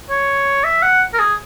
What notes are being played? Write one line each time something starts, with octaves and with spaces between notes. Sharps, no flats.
C#5
E5
F#5
A#4
G#4